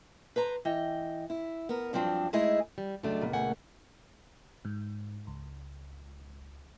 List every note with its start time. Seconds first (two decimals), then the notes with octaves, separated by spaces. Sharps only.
0.36 B4 C5 A#5
0.65 E3 D#5 G5
1.30 E4
1.69 B3 A#4
1.93 G2 F3 F#3 C4 D4
2.33 G#3 A3 D#4 E4 G#4
2.78 G3
3.03 C#2 F#3 A3 D4
3.21 A#2 A#3 B3
3.33 A3 F#5 G#5
4.65 G#2
5.27 C#2